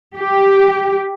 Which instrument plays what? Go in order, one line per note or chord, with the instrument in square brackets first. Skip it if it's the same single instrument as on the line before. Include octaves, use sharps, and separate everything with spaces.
[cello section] G4